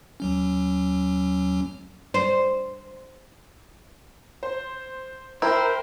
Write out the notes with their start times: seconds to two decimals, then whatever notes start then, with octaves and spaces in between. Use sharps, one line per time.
0.20 D#2 F#3 C#4
2.14 C5
4.43 C5
5.42 E4 A#4 C5 G5 A#5